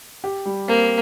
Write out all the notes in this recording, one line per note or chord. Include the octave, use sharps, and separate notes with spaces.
G4
G3
A#3 C4